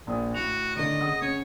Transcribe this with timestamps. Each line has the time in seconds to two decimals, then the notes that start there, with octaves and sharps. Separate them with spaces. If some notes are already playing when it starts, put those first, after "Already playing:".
0.07 A#1 A#2 D#6
0.34 A2 F#4 F7
0.76 D3 D#3 D#5
1.00 C#3 F#5 D#6
1.22 C#4 C#5